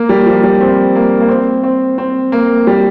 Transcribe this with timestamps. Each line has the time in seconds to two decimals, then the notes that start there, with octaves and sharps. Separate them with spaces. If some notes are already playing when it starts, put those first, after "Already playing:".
Already playing: A#3
0.09 G3
0.26 F3
0.44 G3
0.60 C4
0.96 A#3
1.21 A#3
1.29 C4
1.63 C4
1.98 C4
2.32 A#3
2.67 G3